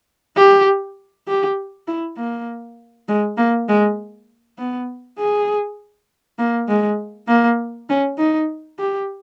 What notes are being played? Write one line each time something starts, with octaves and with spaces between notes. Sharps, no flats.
G4
G4
E4
A#3
G#3
A#3
G#3
B3
G#4
A#3
G#3
A#3
C#4
D#4
G4